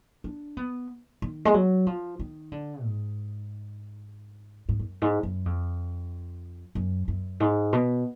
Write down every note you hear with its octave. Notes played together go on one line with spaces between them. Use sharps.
D4
B3
D#3
G#3
F#3
F3
D#3
D3
G#2
G#2
F#2
G#2
F#2
F2
F#2
F#2
G#2
B2